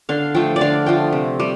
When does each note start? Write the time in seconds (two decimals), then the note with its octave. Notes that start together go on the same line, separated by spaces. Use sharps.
0.09 D3 F5
0.35 F3 A3 G5
0.56 D5
0.61 D3 F5
0.86 F3 A3 G5
1.13 C3
1.40 G3